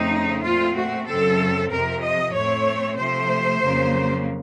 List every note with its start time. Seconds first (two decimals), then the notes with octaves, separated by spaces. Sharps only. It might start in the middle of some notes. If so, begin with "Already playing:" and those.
Already playing: F2 C#3 A3 C4 D#4
0.45 A#2 A3 C4 F4
0.77 F#4
1.08 F#2 C#3 F#3 C4 A4
1.72 F2 C3 F3 A#4
2.03 D#5
2.35 A2 A3 C4 C#5
2.99 C3 F3 A3 C5
3.63 F2 C#3 F#3 A#3